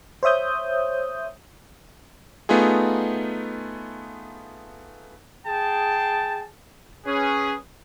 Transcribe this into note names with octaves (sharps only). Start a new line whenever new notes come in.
C5 C#5 E5 D#6 G6
A3 B3 D#4 F4 G#4
G#4 G5 A5
C#4 G#4 B4